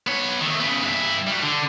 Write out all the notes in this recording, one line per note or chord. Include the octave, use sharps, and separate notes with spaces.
B3 C#5
D#3 A3
C#3 B3
G2 E4
F#3 G3
D3